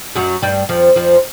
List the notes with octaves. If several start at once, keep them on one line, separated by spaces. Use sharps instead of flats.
F#2 F#3
G2 G3
F2 F3
F2 F3